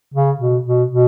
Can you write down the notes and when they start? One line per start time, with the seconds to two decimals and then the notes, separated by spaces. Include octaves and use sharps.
0.14 C#3
0.39 B2
0.65 B2
0.91 B2